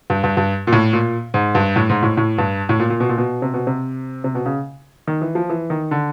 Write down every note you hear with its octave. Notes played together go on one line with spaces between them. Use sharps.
G2
G2
G2
A#2
A2
A#2
G#2
G2
A2
G#2
A2
A2
G2
A2
A#2
A#2
B2
A#2
B2
C3
B2
C3
C3
B2
C#3
D#3
E3
F3
E3
D#3
D3